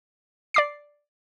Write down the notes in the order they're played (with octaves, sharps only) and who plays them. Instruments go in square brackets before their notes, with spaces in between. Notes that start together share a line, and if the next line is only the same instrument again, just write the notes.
[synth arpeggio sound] D5 D6 C7